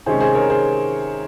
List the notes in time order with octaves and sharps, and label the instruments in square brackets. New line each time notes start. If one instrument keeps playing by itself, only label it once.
[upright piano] C3 D#3 G#3 C#4 G#4 C5
G#4 C5
A#4 C#5
G#4 C5